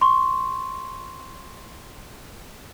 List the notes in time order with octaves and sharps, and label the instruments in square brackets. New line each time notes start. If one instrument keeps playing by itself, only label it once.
[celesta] C6 C#6